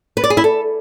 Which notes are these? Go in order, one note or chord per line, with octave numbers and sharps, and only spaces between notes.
B4
D5
G#4
E4
A4